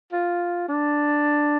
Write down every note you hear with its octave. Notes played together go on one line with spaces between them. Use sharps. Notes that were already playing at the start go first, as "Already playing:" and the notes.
F4
D4